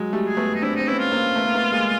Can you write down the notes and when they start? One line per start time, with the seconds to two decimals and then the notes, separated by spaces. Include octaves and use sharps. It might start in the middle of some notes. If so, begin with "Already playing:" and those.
Already playing: F#3 G#3
0.13 G3 A3
0.25 G#4
0.37 A3 B3
0.55 D#4
0.62 C4 D4 E4
0.76 C4 D#4
0.87 B3 C#4 E4
0.99 F4
1.12 A#3 C4
1.36 A3 B3
1.46 A#3
1.54 A3 B3
1.72 G#3 A#3